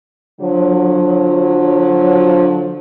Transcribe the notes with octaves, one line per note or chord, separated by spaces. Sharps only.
D3 F3 F#3